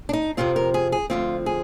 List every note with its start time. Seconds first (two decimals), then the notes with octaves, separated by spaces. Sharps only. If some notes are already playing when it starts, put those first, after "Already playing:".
0.09 D4
0.13 D#4
0.37 F2 C3 F3 C4 F4
0.56 A#4
0.74 G#4
0.92 G#4
1.10 D2 D3 F3 C4 F4
1.46 G#4